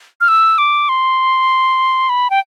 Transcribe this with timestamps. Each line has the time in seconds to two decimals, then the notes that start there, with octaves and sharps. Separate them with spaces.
0.21 F6
0.28 E6
0.58 D6
0.89 C6
2.09 B5
2.30 G5